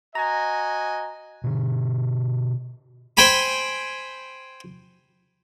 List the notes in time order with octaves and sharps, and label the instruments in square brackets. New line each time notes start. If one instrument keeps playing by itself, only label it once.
[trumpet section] F#4 D#5 G#5 [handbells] A#5 A#6
[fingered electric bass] B2 D3
[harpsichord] C5 G5 G#5 B5